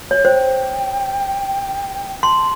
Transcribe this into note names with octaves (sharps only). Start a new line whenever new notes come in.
C#5
C5 G5
A5 C6